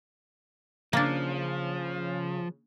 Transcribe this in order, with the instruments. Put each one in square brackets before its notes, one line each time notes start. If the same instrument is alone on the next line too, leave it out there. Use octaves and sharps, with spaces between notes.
[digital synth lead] C#3 [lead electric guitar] F3 [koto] A#3 D4